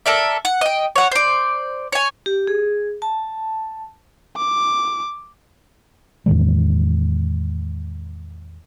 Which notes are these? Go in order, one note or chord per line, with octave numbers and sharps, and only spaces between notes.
A4 A#4 D5 E5
F#5
D#5 G5
C#5 F#5
C5 D5
C#5 G#5
G4
G#4
A5
D6
E2 A2 D#3 G#3